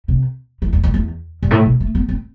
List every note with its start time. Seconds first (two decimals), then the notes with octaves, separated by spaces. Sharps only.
0.08 C3
0.62 E3
0.73 F2
0.83 F2
0.94 E2
1.43 G2
1.51 A2
1.65 B2
1.80 A3
1.95 B3
2.09 C4